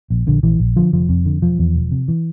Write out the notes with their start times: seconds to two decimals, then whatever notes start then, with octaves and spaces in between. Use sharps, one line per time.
0.10 A#1
0.27 A#1 D3
0.43 A#1 E3
0.60 A#1
0.76 D3 F3
0.93 F1 F3
1.09 F2
1.25 D3
1.42 E1 F3
1.59 E2
1.75 E1
1.92 C3
2.08 E3